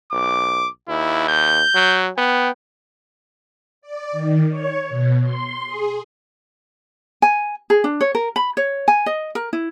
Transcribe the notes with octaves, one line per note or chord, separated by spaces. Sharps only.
B1 D6
D#2 E4
G6
F#3
B3 G5
D5
D#3
C#5
B2
C6
G#4
G#5
G#4
D4
C#5
A#4
B5
C#5
G#5
D#5
A#4
E4